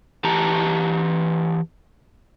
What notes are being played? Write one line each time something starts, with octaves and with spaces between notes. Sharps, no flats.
E3 G4 A5 A#5